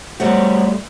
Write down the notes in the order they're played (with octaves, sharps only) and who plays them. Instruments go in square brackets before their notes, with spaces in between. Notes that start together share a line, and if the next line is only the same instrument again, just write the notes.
[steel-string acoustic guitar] F#3 C4 F#4 [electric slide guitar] G3 A3